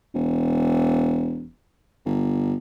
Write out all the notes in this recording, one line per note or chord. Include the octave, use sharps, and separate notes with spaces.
E1
G1